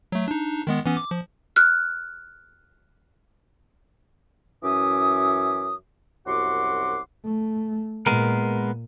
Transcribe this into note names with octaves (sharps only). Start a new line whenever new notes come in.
F#3 A3
D4 D#4
D#3 G#3 B3
E3 B3 C#4
D6
F3
F6 F#6
F#2 E3 C#4 E5 D6 D#6
C2 F#2 F#4 F#5 C6 D6
A3
A#2 G#3 B3 A#4